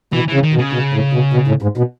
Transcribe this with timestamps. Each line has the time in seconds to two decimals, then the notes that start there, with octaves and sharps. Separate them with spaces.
0.13 B2 E3
0.28 E3
0.33 C#3
0.43 D#3
0.53 B2
0.58 C#3
0.73 B2
0.93 A2
1.13 B2
1.33 B2
1.47 A2
1.62 G#2
1.77 B2